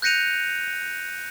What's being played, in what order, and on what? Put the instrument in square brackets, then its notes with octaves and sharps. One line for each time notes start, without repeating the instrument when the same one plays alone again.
[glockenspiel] F#6 G6 A#6 C#7 D#7 F7